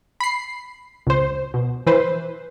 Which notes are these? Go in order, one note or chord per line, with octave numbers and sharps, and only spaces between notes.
B5 C7
C#2 C5
B2
E3 B4 C5